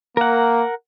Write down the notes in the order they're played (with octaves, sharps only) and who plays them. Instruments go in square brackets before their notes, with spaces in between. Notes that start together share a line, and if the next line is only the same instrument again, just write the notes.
[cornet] A#3 [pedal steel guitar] A#4 F#5